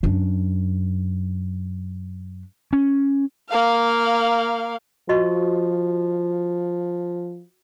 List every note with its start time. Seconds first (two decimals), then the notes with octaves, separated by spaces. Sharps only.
0.03 F#2 D4
2.73 C#4
3.49 A#3 F5
5.09 F3 F#4 D#5 C#6